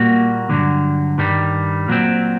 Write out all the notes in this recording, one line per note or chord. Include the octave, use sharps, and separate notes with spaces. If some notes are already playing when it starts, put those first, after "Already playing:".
Already playing: A#2 G3 A#3 F#4
G2 D3 F#3
G2 D#3 G3
A#2 F#3 C4